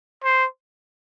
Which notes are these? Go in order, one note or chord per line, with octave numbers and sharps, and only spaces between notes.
C5